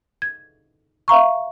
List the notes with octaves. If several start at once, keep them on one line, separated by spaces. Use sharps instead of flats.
G#6
E5 F5 A#5 C#6